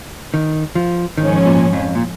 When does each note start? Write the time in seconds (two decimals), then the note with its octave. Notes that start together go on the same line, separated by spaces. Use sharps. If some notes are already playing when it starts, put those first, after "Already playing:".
0.34 D#3
0.75 F3
1.18 G#2 D#3 F3 C#4
1.46 A#2
1.73 F2
1.95 A#2